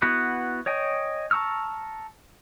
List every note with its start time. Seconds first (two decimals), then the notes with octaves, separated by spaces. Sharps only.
0.02 B3 E4 F#4 B4
0.66 C#5 D#5 G5 G#5
1.31 A5 A#5 C#6 E6 F6